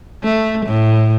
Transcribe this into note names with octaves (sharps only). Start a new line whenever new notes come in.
A3
A2